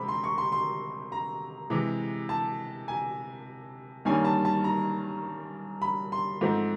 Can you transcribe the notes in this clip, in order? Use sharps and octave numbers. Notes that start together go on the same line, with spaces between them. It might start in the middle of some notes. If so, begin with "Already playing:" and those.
Already playing: C3 G#3 C4 B5
C6
C#6
C6
C6
A#5
C3 E3 G#3
A5
G#5
G2 D#3 G3 A#3 C#4 G#5
A5
A5
A#5
B5
C6
G#2 F3 A3 C4